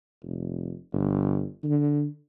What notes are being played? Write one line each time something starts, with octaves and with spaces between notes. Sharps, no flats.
F1
G1
D3